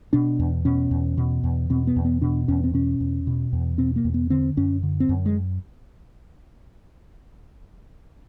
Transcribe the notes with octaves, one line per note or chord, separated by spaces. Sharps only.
B2 D4
E2
B2 C#4
E2
B2
E2
B2 C4
B3
E2
B3
B2 D4
E2 C#4
C4
B2 C#4
E2
B2
E2
B2 C4
A#3
E2
B3
D3 C4
F#2 C#4
D3
C4
F#2
G#3